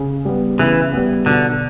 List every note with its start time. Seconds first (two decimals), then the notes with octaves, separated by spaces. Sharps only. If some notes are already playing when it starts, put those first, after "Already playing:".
Already playing: C#3
0.25 G3 B3
0.59 C#3 E3
0.93 G3 B3
1.26 B2 D3